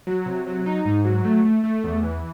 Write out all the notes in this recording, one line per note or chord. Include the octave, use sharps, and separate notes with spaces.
F#3
C3
F#3
D#4
G#2
F#3
A3
A3
A3
E2
E3